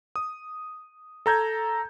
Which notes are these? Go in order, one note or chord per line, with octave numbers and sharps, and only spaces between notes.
D#6
A4 A#5 G6 G#6